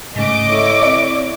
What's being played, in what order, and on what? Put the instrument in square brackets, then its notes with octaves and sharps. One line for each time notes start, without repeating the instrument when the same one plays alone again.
[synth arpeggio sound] G#2 C#3 [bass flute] A3 [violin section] D#5 D6
[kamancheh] E4 C#5 [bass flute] A4
[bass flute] C4 [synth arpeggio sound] D5